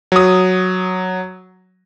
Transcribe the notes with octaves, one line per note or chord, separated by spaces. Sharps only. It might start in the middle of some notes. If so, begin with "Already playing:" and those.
F#3 D#6